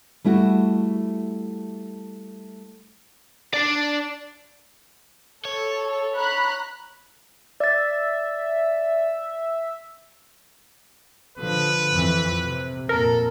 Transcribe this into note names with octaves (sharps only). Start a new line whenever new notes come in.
G3 A3 E4 F#4
D4 D5
A4 C#5
A#5 B5 F#6
D5 E5 A6
D3 F3 B4
F2 E3
C3
F2 A#2 A4 A#4